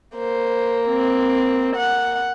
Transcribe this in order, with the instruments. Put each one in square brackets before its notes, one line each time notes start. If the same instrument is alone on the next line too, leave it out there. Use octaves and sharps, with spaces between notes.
[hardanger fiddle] A#3 [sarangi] C5
[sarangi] C4
F#5